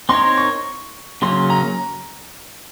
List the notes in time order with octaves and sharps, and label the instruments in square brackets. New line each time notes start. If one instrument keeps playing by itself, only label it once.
[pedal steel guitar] C4 D#4 A#4 C#5 [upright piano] C6
[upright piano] C#6
[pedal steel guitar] C#3 F#3 A#3 C#4 [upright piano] C6
[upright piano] A#5